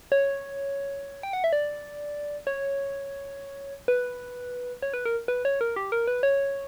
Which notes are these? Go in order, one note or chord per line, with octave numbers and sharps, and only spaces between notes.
C#5
G5
F#5
E5
D5
C#5
B4
C#5
B4
A#4
B4
C#5
A#4
G4
A#4
B4
C#5